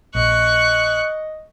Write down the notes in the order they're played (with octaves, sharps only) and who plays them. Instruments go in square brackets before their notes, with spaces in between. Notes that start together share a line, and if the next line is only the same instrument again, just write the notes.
[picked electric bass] A#1 [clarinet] D#5 [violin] C#6 F#6